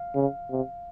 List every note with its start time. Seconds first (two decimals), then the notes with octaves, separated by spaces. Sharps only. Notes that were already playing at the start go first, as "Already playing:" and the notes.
Already playing: F5
0.15 C#3
0.50 C3